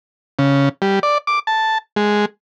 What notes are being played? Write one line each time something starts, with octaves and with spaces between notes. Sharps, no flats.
C#3
G3
D5
D6
A5
G#3